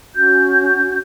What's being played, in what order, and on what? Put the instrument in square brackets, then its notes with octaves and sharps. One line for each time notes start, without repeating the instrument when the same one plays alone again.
[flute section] C#4 F#4 G6